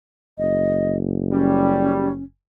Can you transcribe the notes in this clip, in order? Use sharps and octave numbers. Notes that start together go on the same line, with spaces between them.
F#1 D#5
G3 C#4